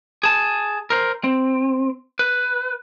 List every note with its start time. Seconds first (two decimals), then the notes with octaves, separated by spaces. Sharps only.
0.23 G#4 A5
0.90 A#4 C5
1.24 C4
2.19 B4